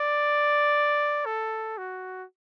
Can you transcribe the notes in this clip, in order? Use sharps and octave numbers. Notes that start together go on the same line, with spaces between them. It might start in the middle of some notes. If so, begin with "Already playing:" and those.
Already playing: D5
A4
F#4